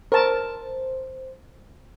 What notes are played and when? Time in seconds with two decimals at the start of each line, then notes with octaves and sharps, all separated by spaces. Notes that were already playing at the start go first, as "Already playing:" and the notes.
0.12 A#4 C5 A5